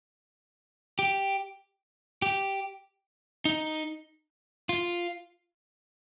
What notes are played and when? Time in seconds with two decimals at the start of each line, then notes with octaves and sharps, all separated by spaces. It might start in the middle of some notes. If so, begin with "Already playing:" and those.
0.99 G4
2.22 G4
3.45 D#4
4.69 F4